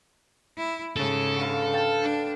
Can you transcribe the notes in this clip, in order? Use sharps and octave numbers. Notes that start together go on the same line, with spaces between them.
E4
G#2 C#3 A4
D3 B4 F5
F5 G5 A5
D4